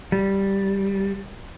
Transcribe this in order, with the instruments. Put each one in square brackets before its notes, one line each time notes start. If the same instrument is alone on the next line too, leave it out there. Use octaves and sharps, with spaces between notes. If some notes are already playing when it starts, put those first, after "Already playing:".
[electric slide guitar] G3